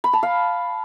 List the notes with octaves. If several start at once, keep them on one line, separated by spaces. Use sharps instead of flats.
B5
A5
F5